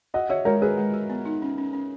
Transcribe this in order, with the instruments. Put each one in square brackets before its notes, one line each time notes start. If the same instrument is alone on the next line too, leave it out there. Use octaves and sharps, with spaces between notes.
[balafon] F#4 [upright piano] D#5 F#5
[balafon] F#4 [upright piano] C#5 E5
[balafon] G#3 [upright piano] A#4 C#5
[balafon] F#4 [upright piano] G#4 B4
[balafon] G#3
F#4
B3
D#4
C#4
C#4
C#4